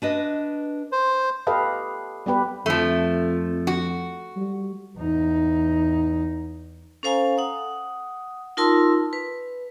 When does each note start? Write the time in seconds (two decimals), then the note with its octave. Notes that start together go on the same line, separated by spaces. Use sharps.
0.02 D4 B4 D#5
0.92 C5
1.47 G4 A4 B4 D#5 F5
2.26 G3 B3 G4 B4
2.66 F2 F3 A3
3.67 F#4
4.36 G3
4.97 E2 D#4
7.03 C#4 A4 C5 F5 G#5 A#5
7.38 F#5 D#6
8.57 D#4 F4 A#4 A5 C6 E6
9.13 B4